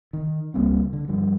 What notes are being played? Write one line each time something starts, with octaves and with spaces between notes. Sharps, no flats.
D#3
C#2 G3 A#3 C4
D3
G2 F3 G3